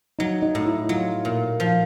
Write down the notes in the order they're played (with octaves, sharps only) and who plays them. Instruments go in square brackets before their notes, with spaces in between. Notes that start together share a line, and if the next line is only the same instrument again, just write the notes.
[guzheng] F#3 [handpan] D#4
[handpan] D#4
[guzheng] A2
[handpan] E4
[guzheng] F#3 [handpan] F4
[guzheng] A#2
F3